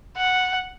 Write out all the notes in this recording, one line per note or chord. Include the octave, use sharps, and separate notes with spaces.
F#5